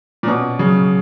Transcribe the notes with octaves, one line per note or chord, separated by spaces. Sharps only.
A#2
B2 C#4
C#3 F#3